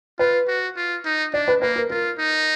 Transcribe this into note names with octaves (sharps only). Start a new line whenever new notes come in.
F4 B4
F#4
F4
D#4
D4 D5
B4
A#3 B4
A#4
F4 A#4
D#4